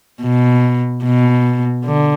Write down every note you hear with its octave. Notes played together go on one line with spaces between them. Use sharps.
B2
B2
D3